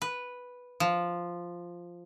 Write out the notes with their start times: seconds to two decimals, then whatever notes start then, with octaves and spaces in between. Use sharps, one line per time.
0.02 B4
0.80 F3